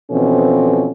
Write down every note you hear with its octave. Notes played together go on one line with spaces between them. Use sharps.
B2 E3 F3 C4 C#4 A4